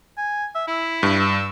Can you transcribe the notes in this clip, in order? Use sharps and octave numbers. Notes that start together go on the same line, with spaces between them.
G#5
E5
E4
G2
E6